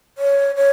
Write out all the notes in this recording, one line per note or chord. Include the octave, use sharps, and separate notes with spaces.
C#5
C#5